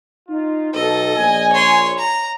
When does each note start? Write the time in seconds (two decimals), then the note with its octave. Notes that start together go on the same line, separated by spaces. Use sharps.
0.29 D#4 F4
0.74 B1 A4 D#5
1.16 A#1 G#5
1.53 C#5 C6
1.99 A#5